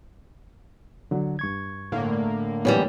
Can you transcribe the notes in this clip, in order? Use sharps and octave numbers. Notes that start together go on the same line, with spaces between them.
D3 F#3
G2 C#6 G#6
A2 D3 A#3
F#2 E3 G3 B3 G#5